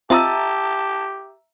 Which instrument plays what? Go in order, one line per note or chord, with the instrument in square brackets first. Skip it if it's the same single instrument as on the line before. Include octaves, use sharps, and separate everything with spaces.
[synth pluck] C4 F4 D#5 [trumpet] G4 [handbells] E5 A#5 E6 [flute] A5